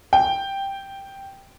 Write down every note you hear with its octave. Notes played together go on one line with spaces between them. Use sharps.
G5